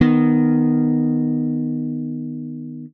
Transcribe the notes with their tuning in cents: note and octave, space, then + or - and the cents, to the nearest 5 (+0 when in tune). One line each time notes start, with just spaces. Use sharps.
D#3 -15 B3 +0